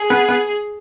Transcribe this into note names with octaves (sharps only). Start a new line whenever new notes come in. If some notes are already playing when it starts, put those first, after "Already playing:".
Already playing: G#4
B3
B3